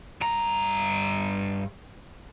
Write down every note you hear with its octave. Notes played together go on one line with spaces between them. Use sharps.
G2 A#5